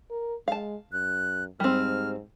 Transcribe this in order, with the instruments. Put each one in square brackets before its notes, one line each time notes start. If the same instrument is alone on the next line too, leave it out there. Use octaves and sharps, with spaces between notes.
[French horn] A#4
[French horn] G#3 [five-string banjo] F5 A5
[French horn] F#2 [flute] F#6
[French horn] G#2 [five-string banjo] G3 C4 [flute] F6